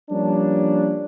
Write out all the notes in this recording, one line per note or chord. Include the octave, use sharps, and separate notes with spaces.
F3 G3 A#3 C#4 D4